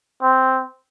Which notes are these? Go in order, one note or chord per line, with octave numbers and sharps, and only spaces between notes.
C4